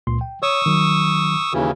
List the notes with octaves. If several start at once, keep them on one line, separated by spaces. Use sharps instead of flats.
C#2 A#2 C6
G5
C#5 C#6 D#6 E6
D#3 F#3
D#2 C#3 E3 F#4